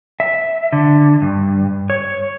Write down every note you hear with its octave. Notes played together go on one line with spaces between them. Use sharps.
E5
D3
G2
C#5